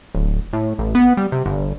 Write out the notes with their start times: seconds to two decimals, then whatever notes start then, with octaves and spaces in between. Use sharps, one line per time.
0.15 D1
0.53 A2
0.79 A1
0.95 B3
1.17 G3
1.32 C3
1.46 G1